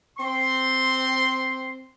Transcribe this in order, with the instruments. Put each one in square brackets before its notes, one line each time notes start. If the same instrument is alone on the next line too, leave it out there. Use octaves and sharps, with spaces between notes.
[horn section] C4 C6